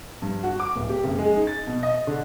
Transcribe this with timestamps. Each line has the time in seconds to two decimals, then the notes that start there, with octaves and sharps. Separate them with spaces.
0.22 G2
0.43 F#4
0.60 D6
0.76 D1
0.90 G4
1.04 F#1
1.18 G#3
1.36 D#4
1.47 A6
1.67 B2
1.83 D#5
2.07 D3